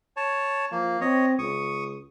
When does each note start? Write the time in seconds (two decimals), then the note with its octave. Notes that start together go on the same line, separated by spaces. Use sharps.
0.17 C#5 A5
0.72 F3 A#3
1.01 C4 C#5 D#5
1.39 C#2 C#6 D#6